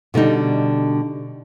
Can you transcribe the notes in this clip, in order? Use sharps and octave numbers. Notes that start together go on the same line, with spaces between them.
B2 D3 G3 D#4